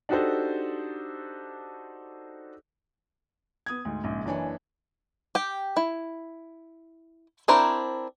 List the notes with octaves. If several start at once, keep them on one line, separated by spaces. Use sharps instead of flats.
D4 D#4 F#4 G4 A4 C5
B3 D#6 G#6
D2 G#2
A#1 G#2 C#3
F#1 E3 D4 C#5 G#5
G4 G5
E4
C4 D4 E4 A#4 C5